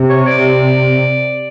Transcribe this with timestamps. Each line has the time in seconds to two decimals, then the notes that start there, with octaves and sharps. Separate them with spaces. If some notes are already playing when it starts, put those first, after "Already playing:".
Already playing: C3
0.09 C#5
0.27 D5